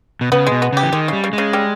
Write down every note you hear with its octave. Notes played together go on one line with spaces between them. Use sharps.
B2
C#3 B3
G#3
B2
B3
C#3 G4
E3
D#3 G#3
C#3 G3
C#3
G#3
C#3
G3